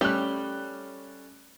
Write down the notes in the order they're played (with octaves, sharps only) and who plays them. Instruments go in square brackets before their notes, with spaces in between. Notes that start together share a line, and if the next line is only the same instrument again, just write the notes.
[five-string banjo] G3 A3 G4 [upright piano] C#4 F#6